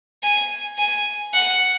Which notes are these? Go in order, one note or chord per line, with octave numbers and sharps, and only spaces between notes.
G#5
G#5
F#5